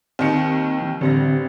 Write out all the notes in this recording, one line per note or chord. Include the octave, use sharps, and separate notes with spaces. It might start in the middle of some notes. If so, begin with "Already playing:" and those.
D#2 D#3 C4 C#7
E3
A1 D3 G3 C4 A#6